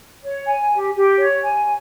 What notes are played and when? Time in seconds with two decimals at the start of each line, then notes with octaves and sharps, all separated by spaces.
0.24 C#5
0.48 G#5
0.72 G4
0.95 G4
1.18 C#5
1.43 G#5